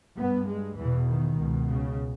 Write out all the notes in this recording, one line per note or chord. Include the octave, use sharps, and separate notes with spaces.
G2 B3
G#3
E2 B2 E3
D#3
C#2 B2
C#3